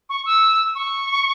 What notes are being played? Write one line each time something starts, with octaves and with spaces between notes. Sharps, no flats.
C#6
E6
C#6